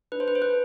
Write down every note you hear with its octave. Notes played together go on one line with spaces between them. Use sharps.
D4 B4
C5
B4
C5
B4